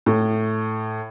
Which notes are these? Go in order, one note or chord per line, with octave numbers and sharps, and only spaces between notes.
A2